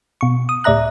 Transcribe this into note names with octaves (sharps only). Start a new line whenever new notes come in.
B2 C#6
D#6
C#2 A2 D5 E5 A#5 F#6